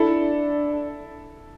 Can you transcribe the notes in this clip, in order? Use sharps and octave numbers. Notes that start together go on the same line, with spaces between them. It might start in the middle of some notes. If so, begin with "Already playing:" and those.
Already playing: D4 E4 A4